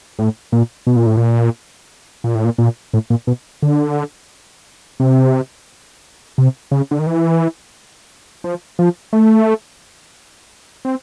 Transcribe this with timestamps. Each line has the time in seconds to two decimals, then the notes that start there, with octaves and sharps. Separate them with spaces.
0.19 A2
0.52 A#2
0.87 B2
0.96 A#2
1.06 A2
1.17 A#2
2.24 A#2
2.35 A2
2.45 A#2
2.58 A#2
2.93 A2
3.10 A#2
3.27 B2
3.62 D3
5.00 C3
6.38 C3
6.71 C#3
6.91 D3
6.99 D#3
7.07 E3
8.44 F3
8.79 F3
9.13 A3
10.85 C4